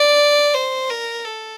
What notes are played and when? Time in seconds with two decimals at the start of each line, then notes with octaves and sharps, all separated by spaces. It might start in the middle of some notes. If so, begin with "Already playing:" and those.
Already playing: D5
0.55 C5
0.90 A#4
1.25 A4